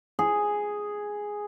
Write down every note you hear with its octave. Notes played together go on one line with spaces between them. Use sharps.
G#4